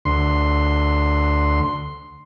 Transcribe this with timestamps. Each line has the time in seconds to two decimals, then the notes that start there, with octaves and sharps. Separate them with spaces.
0.05 D2 C6